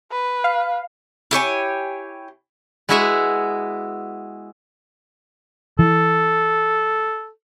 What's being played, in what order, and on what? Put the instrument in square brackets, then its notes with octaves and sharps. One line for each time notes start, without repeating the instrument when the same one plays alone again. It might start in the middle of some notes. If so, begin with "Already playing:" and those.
[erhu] B4
[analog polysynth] F5
[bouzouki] E4 G4 C#5 G#5
[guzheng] G#3 B3 E4 F#4 E5 F#5
[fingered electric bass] E3 [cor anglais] A4